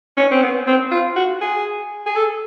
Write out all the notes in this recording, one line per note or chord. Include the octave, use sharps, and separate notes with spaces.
C#4
C4
B3
C4
F4
F#4
G#4
G#4
A4